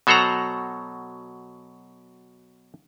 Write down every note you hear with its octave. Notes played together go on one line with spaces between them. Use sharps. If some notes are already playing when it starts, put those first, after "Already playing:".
B2 F#3 A4 C5 F#5 A#5